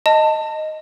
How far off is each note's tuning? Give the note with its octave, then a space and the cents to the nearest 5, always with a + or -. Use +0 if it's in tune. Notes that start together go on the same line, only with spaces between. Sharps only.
D#5 +0 A5 +25